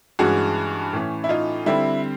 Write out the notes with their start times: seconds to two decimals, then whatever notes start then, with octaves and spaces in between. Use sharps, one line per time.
0.19 G2 E3 G#3 C#4 F#4 G#4
0.93 A2 E3 A3 C#4
1.24 E4
1.29 D#4 F4
1.66 D3 G3 C4 E4